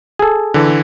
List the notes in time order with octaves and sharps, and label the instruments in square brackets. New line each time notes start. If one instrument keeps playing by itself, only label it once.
[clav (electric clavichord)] G#4 A4
[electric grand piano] D3 E3